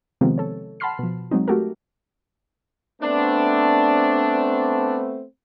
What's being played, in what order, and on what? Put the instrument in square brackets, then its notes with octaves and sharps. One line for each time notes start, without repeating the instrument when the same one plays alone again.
[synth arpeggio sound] C3 D#3 F3 G#3 B3 C4
A4 C#5
F#5 A5 B5 C6 F6 C7
B2 F3
F#3 G#3 C4 D#4
A3 F#4 G4 A4 A#4
[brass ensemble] A3 B3 C4 [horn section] D4